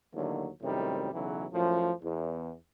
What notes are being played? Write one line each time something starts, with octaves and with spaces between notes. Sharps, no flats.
D#2 A2 D3 F#3
F#2 A2 C3 D#3 G3
B1 E2 C#3 E3 F#3
F#2 A2 F3
E2